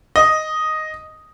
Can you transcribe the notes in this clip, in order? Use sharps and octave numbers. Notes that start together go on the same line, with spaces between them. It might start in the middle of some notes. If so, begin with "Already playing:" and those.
D#5